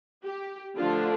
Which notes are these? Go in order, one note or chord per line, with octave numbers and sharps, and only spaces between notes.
G4
D3 F3 A3 D4 F4